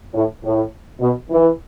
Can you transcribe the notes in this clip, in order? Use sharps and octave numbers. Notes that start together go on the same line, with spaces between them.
A2
A2
B2
E3